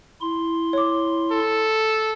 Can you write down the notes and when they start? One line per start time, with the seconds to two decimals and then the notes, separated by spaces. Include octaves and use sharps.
0.21 E4 C6
0.73 C#5 D6
1.31 A4